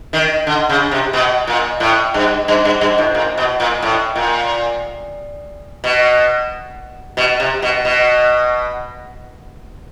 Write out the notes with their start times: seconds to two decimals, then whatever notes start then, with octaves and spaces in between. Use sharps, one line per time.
0.13 D#3
0.47 D3
0.70 C#3
0.91 C3
1.13 B2
1.47 A#2
1.80 A2
2.14 G2
2.48 G2
2.65 G2
2.81 G2
2.98 A2
3.15 A#2
3.38 B2
3.60 A#2
3.82 A2
4.16 A#2
5.84 B2
7.17 B2
7.40 C3
7.62 B2
7.85 B2